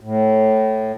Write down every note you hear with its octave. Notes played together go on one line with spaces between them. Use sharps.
A2